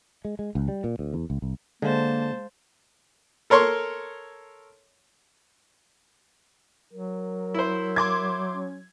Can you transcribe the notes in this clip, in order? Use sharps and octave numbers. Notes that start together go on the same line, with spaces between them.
G#3
G#3
C#2
G3
A#2
D2
E2
C#2
C2
D3 G#3 A#3 C5 F5 A5
A4 A#4 C#5 C6 C#6
F#3 A#4
E4 C5
C6 D6 G#6
C#4